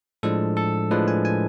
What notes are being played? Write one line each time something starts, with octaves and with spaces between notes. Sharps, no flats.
A2 F3 G#3 D4 A4
A4
A2 F3 G#3 D4 B4
G#5
G#5